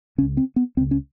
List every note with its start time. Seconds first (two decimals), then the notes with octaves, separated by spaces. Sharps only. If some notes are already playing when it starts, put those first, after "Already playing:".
0.18 C#3 C#4
0.22 C#2
0.37 C4
0.56 B3
0.77 C#2 C4
0.81 C#3
0.91 C#4